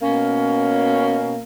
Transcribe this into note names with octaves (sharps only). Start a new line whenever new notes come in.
B2 A#3 C#4